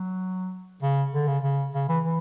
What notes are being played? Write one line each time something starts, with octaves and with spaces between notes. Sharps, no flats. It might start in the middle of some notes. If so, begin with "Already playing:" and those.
Already playing: F#3
C#3
D3
C#3
C#3
C#3
E3
E3